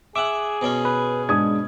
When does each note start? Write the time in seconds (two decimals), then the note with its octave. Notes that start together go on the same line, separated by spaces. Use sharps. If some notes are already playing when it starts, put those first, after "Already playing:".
0.16 G#4 E5 F#5 D6
0.62 B2 C#4
0.85 B4
1.29 G#2 D4 D#6 G#6